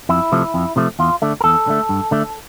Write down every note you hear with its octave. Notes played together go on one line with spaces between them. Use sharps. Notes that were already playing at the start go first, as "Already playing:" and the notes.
F2 E4
C3 F3 A3
F2
C3 F3 A3
E2 F4
D3 A3
A#4
E2 A4
D3 A3
G2
D3 A3